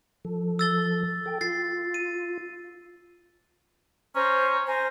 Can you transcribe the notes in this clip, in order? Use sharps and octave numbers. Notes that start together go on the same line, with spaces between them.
F3 A4
E6 A6 G7
A4 G5
F4 A6 C7
D#7
C#4 C5 A#5
C5 G#5 A#5